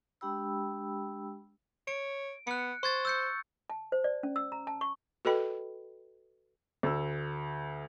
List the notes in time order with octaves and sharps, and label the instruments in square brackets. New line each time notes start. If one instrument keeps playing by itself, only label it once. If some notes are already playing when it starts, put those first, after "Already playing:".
[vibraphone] G#3 D4 G4 G5 B5 E6
[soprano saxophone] C#5 [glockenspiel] D7
[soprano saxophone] B3 [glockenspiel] F#6 C#7
[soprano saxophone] C5 [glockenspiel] C#6 G#6 A6
[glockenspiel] E6 G6 C#7
[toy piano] A5
C5
D5
C#4
E6
A#5
A5
C#6
[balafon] F#4 A4 B4 D#5 G5 B5
[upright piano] D2 E6